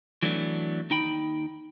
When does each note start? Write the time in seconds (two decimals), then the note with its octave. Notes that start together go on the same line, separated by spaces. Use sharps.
0.23 E3 F#3 A3 B3 D4
0.90 D#2 D#4 G5 B5